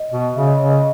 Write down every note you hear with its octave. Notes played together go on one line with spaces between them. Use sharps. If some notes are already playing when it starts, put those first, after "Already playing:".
Already playing: D#5
B2
C#3 E5
D#5
C#3 C#5
D#5